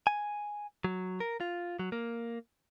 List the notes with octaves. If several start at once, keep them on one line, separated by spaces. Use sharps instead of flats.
G#5
F#3
A#4
F4
F#3
A#3